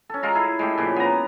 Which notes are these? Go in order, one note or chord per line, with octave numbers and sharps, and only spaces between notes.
C#4 A4
G#3 F4 A#5
E4 G#4 A4
G#3 A3 G4
A#2 C#3 F3
B3 A#5